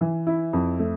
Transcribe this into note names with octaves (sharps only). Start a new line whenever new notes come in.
E3
E4
F2
A3